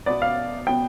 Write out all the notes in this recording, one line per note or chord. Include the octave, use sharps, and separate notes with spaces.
B2 B3 D5
F5
B2 B3 G5